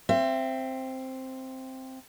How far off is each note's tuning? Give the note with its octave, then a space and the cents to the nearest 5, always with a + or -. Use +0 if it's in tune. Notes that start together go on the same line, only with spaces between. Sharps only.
C4 +0 E5 +30